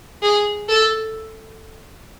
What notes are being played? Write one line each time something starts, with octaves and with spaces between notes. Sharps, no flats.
G#4
A4